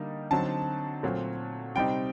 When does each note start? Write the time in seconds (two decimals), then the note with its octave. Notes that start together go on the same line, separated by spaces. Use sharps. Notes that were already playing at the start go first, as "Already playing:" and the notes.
Already playing: D3 G3 A#3 D#4
0.31 D3 F#3 C4 D#4 A5
1.03 A#2 F#3 A3 C4
1.75 C3 G3 C4 D#4 G5